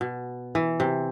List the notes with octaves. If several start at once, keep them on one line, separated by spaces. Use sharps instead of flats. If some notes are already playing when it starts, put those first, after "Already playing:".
B2
E3
C3